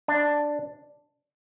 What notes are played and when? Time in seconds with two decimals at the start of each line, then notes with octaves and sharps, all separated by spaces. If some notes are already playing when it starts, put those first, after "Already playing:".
0.08 D4